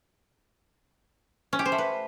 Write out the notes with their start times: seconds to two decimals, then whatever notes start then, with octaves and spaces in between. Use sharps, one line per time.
1.53 C#4
1.59 G4
1.65 C5
1.72 A3
1.78 B4